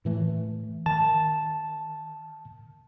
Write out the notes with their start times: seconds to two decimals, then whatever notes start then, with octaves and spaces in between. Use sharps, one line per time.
0.05 A2 E3 A3
0.86 D#3 A5